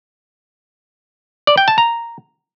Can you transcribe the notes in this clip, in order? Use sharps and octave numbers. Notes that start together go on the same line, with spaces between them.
D5
G5
A5
A#5